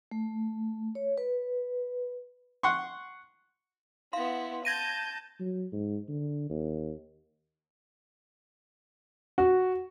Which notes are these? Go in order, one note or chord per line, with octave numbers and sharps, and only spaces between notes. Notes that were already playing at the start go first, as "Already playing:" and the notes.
A3
C#5
B4
F#5 C6 C#6
B3 E4 F5 C6
A5 G6 G#6 A#6 D#7
F#3
G#2
D3
D#2
F#4